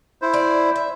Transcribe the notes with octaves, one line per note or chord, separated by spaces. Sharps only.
E4 C5
D5
E5